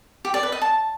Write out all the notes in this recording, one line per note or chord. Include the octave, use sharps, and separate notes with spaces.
G4
D5
B4
D#5
A5